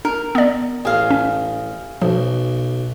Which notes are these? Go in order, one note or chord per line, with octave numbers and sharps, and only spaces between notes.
D4 A#4
B3 D5
A1 G#4 F5
C#4
B1 F3